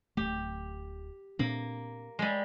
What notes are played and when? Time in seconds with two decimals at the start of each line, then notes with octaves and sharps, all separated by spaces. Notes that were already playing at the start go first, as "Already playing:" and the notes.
0.17 D1 A3 G4
1.39 A#2 A#3 C4 D4
2.19 G3 G#3